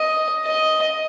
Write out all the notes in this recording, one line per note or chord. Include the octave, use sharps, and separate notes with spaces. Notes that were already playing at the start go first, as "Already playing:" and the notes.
Already playing: D#5
D#5